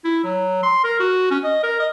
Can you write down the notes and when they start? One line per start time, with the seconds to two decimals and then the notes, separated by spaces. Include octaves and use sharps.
0.05 E4
0.24 F#3
0.63 C6
0.84 A#4
1.00 F#4
1.31 C#4
1.44 D#5
1.63 A#4
1.80 D#5